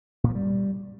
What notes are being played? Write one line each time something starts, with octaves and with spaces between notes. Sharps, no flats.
A#2
F3
G3